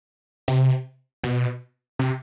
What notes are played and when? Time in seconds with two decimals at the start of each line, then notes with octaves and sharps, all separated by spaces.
0.48 C3
1.23 B2
1.99 C3